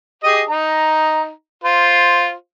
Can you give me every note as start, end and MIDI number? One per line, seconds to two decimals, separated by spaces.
0.24 0.43 67
0.24 0.43 68
0.24 0.43 75
0.49 1.30 63
0.49 1.30 82
1.64 2.33 65
1.64 2.33 72